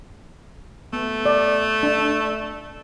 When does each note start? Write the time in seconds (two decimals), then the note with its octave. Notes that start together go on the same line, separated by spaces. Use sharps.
0.93 A3 B3
1.26 D5
1.83 D4